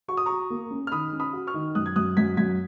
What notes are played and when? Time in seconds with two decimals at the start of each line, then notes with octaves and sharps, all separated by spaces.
0.08 F#4 C#6
0.17 D#6
0.26 F#4 A#5 C#6
0.50 A#3
0.71 C#4
0.87 F6
0.92 D#3 B5 D#6
1.12 C#4
1.20 B5 D#6
1.33 F#4
1.47 C#6 F6
1.54 D#3
1.75 F#2 D#6 F#6
1.86 G#6
1.96 F#2 D#6 F#6
2.17 F#2 G#6 B6
2.37 F#2 G#6 B6